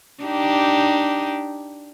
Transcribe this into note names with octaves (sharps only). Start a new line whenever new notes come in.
D4 D#4 G4